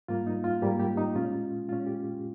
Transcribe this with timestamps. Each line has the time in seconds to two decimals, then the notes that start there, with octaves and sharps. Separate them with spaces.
0.08 G#2 G3 A#3 F4
0.27 D#4
0.44 F4
0.62 G#2 G3 A#3 G4
0.80 G4
0.97 D#4
1.15 A#2 G#3 C#4 F4
1.69 A#2 G#3 C#4 F4
1.86 G4